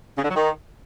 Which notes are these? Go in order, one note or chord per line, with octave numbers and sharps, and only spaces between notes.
C#3
D3
F#3
D#3